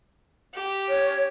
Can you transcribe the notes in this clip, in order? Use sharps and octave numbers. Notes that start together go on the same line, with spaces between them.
G4
C#5